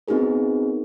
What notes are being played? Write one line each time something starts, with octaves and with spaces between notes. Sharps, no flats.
B3 C4 D#4 F#4 G#4 A#4